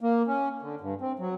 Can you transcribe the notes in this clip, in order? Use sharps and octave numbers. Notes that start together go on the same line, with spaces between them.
A#3
C#4
D3
G2
C4
F#3